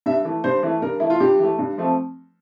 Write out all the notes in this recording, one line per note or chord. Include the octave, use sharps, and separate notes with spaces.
G2 E5
E3 A3
G2 C5
E3 A3
G2 A#4
E3 A3 E4
F4
G2 G4
E3 A3
G2
F3 A3 C4